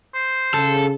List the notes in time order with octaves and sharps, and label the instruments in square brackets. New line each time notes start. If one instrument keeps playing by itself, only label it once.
[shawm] C5
[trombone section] C#3 [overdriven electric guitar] A4